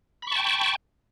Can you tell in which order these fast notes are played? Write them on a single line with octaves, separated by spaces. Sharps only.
B5 C#6 A5 G5